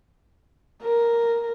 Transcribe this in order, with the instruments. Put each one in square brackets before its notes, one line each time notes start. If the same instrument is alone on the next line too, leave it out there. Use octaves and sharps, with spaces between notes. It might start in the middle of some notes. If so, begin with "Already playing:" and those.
[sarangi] A#4